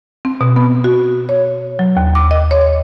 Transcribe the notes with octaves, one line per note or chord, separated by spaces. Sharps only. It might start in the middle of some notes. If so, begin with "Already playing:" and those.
C4
B2
B3
F#4
C#5
F#3
D#2
D6
D#5
C#5